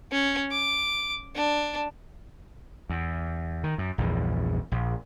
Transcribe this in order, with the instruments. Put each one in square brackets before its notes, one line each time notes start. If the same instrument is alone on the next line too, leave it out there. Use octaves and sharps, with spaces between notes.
[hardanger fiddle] C#4
D6
D4
[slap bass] E2
D#3
F#2
A#1 E2 G2
A#1